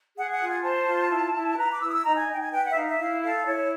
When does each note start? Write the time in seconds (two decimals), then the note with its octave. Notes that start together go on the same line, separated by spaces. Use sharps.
0.16 G#4 F#5
0.31 F#5
0.40 F4
0.48 G#5
0.63 C5 A5
0.87 F4
1.10 E4
1.34 E4
1.58 B4 A#5
1.70 D6
1.81 E4 E6
1.88 D#6
1.92 E6
2.04 D#4 A#5
2.16 G#5
2.28 D#4
2.35 G5
2.40 G#5
2.52 B4 G5
2.64 F#5
2.70 E5
2.75 D#4 F5
2.87 E5
2.99 E4 F5
3.22 A4 F5
3.46 E4 C#5